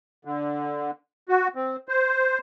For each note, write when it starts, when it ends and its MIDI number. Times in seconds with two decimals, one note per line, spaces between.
0.25 0.91 50
1.29 1.48 66
1.55 1.76 60
1.88 2.38 72